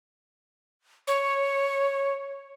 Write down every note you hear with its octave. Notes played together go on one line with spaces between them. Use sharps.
C#5